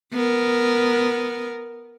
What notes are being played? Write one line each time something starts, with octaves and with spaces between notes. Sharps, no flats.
B3 A#4